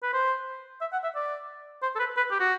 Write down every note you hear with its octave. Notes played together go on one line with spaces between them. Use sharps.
B4
C5
E5
F#5
E5
D5
C5
A4
B4
B4
G4
F#4